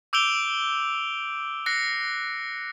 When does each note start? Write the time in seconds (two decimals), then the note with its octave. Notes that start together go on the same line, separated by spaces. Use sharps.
0.13 D6 E6 G6 D7 F7 G7
1.66 F#6 A#6 C7 C#7